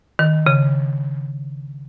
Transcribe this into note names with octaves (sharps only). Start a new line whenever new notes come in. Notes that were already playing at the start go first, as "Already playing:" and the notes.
D#3
C#3